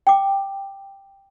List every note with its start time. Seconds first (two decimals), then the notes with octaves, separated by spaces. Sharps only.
0.07 G5 D6